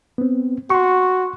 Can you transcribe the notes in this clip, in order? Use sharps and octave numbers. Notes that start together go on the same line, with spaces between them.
B3 C4
F#4 C6 C#6